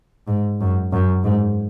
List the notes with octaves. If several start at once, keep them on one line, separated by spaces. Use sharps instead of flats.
G#2
F#2
F#2
G#2